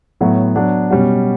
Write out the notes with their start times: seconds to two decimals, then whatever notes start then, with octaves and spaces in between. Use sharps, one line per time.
0.21 A2 F#3 B3 F#4
0.56 F#3 B3 D4
0.91 B2 G3 C#4 F#4